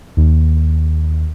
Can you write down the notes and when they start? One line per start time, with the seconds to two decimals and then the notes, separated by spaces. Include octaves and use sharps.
0.17 D#2